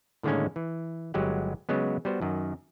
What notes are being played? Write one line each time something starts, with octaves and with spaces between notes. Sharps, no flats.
A2 D3 D#3 G#3 A#3 C#4
E3
G1 F#3 G#3 G4 F#5
C#3 F#3 G#3 B3
G3 B3 F#4 C5
F#2 D#3